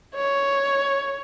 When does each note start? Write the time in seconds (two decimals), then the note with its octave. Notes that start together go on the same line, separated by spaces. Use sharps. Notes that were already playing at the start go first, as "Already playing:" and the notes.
0.15 C#5